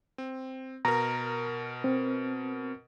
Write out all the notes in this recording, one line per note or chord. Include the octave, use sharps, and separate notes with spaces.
C4
B2 A#4 A#5
C4